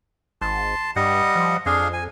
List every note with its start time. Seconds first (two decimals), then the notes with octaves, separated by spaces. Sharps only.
0.41 G#1 A5 C6
0.96 G2 G3 D#5 F#5
1.36 F3
1.66 F2 D4 G#4 F5
1.93 G#5